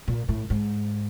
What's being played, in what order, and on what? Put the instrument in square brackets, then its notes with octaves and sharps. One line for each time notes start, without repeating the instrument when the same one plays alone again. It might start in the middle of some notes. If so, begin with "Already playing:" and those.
[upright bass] A#2
A2
G#2